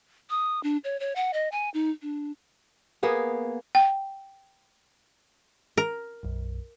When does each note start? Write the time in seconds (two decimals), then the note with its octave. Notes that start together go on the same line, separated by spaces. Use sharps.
0.30 D#6
0.63 D4
0.84 C#5
1.00 C#5
1.16 F#5
1.33 D#5
1.52 G#5
1.74 D#4
2.02 D4
3.03 A#3 B3 G#4
3.75 G5
5.78 A#4
6.23 B1 F#2